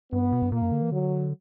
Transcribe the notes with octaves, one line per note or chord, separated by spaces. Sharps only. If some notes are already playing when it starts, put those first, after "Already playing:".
G2 B3
B2
G2
A#2 A#3
F#2
D3
E3
D3 F#3